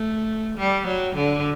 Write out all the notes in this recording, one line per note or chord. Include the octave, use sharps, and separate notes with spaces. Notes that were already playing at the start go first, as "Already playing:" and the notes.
Already playing: A3
G3
F#3
D3